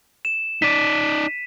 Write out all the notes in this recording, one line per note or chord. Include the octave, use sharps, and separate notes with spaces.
E7
D#4 D5 B6 D#7